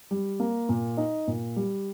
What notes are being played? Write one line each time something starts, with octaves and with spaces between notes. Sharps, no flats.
G3
A#3
A#2
D#4
A#2
G3